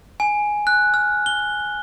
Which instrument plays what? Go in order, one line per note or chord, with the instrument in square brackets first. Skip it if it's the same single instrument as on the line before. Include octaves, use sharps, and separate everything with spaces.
[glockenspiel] G#5
F#6
F6
G7